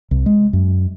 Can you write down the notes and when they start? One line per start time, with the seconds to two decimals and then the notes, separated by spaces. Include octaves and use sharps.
0.11 C2
0.26 G#3
0.53 F#2